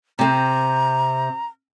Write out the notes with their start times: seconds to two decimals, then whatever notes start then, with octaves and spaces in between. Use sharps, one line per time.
0.19 C3 C4 A#5